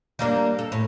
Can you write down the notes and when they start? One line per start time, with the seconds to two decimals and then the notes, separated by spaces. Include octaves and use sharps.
0.19 G3 A#3 D4
0.59 A4
0.72 A2